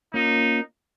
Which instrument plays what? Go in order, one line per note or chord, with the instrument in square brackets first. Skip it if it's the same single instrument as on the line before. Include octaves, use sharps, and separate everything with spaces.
[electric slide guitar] A#3 C#4 F4 [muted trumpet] D#4